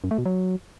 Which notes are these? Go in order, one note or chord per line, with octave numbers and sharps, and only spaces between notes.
F#2
A3
B2
F#3